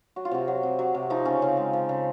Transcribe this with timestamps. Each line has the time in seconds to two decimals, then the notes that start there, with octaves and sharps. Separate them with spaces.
0.16 F#3 F#4
0.25 F4
0.31 C3 F#4
0.48 F#3
0.63 C3
0.79 F#3
0.94 C3
1.10 F3 D#4
1.25 C#3 C#4
1.42 C#3 C4
1.57 G#3
1.73 F3
1.89 C#3